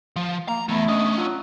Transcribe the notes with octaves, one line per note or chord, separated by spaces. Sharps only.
F3
A#3 A#5
E3 A3 B3 E4
C#4 D4 D#5
F#3 F4